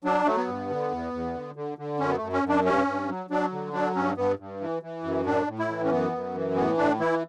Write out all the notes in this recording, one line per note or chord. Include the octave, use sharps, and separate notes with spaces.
F#3 D4
F#3 A3
B3
G2
D3
E2
E2
D3
D3
D3
F#2 C#4
B3
F#2 A3
C#4
F#2
D4
G2 C#4
G2
F#3
F#3 D4
D3
F#3 D4
G2 C#4
G2 B3
G2
E3
E3
F#2
A2 D4
A2
E4
E3
C#4
F#2 B3
F#2
E3
A2 B3
A2 D4
E3 E4